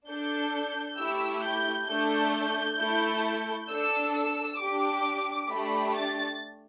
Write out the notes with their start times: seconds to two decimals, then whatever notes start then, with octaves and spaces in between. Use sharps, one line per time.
0.08 D4 A4 G6
0.99 A3 E4 G4 E6
1.44 G6
1.89 A3 D4 A4 G6
2.80 A3 E4 A4
3.70 D4 A4 E6
4.15 E6
4.61 D4 G4 D6
5.50 A3 D4 G4 B5
5.95 A6